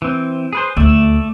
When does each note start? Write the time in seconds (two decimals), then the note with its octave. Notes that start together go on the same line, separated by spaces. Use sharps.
0.02 E3 C4
0.53 G#4 B4 C5
0.77 D2 A3 D5 E5